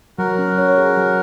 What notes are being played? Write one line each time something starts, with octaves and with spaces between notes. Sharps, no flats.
F#3 F#4 A#4
C#4
C#5
G#4
F#3